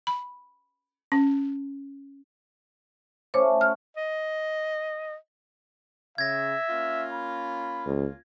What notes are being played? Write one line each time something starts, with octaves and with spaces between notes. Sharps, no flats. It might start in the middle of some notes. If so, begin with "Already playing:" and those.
B5
C#4
A3 C#4 F4 C5 C#5 D6
F#4 F6
D#5
C#3 E5 G#6 A#6
A#3 C#4 F4
B5
C#2